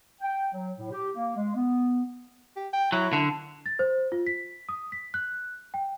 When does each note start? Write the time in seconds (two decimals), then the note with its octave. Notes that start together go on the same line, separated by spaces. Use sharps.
0.21 G5
0.52 F#3
0.78 A2
0.91 G4
1.15 A#3
1.36 G#3
1.55 B3
2.57 G4
2.73 G5
2.92 F#3 E4
3.13 D3
3.66 A6
3.79 C5
4.12 F4
4.27 B6
4.69 D#6
4.92 B6
5.14 F#6
5.74 G5